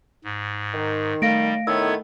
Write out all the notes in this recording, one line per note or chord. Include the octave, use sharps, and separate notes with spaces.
G#2
D#3
G3 A3 F5 A#6 D7
A2 D#3 B3 E6 G#6